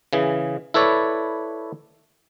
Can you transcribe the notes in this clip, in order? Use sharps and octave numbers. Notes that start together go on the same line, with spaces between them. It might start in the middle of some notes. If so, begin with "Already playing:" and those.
C#3 E3 G#4
E4 A4 B4 C#5 D5